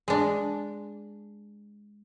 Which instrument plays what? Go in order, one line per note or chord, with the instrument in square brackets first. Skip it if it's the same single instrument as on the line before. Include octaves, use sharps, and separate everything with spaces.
[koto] G#3 D4